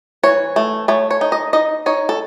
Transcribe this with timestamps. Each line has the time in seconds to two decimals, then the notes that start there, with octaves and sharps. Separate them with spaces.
0.23 E3 C#5
0.56 A3
0.88 A3 C#5
1.11 C#5
1.21 D#4
1.32 D#5
1.53 D#4 D#5
1.86 D#4 C#5
2.09 A4